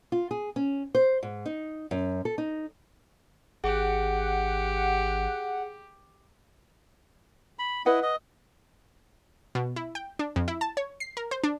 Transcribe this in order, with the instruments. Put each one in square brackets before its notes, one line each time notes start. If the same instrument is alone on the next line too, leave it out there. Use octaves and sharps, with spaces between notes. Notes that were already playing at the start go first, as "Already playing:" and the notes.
[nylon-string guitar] F4
G#4
C#4
C5
G#2
D#4
F#2
A4
D#4
[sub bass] G#1 [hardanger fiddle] G4 [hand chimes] G#4 [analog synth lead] F#5
[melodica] B5
[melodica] E4 D#5 [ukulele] B4 F#5
[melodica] D#5
[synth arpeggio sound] B2
E4
G5
D4
F2
E4
A5
C#5
C7
A#4
C5
D4